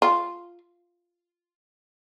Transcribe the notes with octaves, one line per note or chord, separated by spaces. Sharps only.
F4